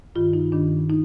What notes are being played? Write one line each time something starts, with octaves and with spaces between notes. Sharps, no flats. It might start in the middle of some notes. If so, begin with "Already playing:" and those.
G2 D#3 F4
D#4
G2 D#3 D4
D#4